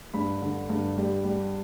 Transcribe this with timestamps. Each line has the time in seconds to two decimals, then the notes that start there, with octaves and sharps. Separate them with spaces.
0.14 G2 B5
0.41 D3
0.69 G2
0.97 G3
1.25 G3